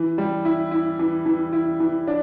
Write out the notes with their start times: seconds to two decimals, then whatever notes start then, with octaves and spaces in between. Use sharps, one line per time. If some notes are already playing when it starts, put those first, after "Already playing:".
Already playing: E3
0.18 G3
0.45 E4
0.71 E4
0.99 E3
1.26 E3
1.53 E4
1.80 E3
2.07 D4